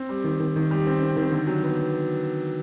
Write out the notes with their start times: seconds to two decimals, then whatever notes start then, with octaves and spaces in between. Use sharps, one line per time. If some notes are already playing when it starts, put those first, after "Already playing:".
Already playing: C4
0.09 G3
0.24 D#3
0.40 D#3
0.56 D#3
0.71 G3
0.86 C4
1.02 C4
1.16 D#3
1.32 D3
1.47 F#3
1.63 B3